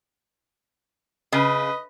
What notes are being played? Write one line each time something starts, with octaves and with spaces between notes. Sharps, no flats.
C#3 B4 D#5